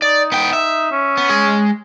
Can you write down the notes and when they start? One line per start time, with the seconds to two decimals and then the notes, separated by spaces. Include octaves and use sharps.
0.02 D#4 D5
0.32 B3 G5
0.53 E5
0.91 C#4
1.17 B3
1.30 G#3 G#4